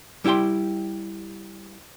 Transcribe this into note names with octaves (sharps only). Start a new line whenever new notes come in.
G3 E4 G4 G5 C6